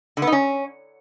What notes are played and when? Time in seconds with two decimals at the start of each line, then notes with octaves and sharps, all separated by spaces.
0.17 D3
0.22 B3
0.27 D#4
0.32 C#4